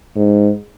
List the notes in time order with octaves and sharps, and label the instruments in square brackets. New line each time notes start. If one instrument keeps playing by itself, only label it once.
[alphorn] G#2